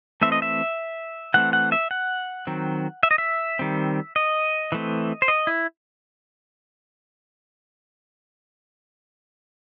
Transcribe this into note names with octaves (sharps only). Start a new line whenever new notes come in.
E3 A3 C4 E5
D#5
E5
E3 A3 C4 F#5
F#5
E5
F#5
D#3 F#3 C4
E5
D#5
E5
D#3 G3 C4
D#5
E3 A3 C4
C5
D#5
E4